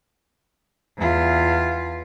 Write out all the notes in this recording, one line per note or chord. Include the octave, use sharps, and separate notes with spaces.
E2 F4